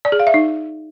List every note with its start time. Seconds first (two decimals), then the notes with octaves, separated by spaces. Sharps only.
0.05 D5
0.12 G#4
0.19 F5
0.27 E5
0.34 D#4